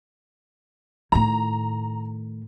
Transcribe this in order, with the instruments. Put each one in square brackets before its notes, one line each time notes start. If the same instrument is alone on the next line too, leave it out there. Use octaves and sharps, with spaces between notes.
[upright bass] A2 D#3 [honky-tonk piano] A#5